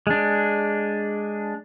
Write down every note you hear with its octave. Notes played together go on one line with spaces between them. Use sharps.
G#3 D4